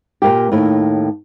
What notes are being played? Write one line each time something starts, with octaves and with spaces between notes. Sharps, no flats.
A#2 A#3 G4
D#2 A2